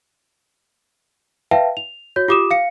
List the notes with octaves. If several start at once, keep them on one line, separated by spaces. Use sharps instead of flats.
B4 E5 F5 G5 A5
F7
F#4 C#5 G6
F4 G4 D6 D#6 E7
F5 C#7